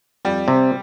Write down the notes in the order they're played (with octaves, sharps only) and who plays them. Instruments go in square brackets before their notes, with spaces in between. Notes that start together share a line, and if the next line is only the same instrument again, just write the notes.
[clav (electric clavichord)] F2 [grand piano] G3
[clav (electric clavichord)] C3